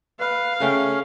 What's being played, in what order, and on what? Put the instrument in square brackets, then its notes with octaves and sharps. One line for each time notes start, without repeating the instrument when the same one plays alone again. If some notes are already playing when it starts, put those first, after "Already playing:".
[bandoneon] B4 [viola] F5
[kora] C#3 A3 G5 [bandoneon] C#4